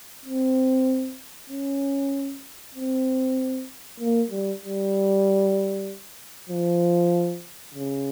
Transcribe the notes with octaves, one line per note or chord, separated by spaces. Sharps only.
C4
C#4
C4
A#3
G3
G3
F3
C#3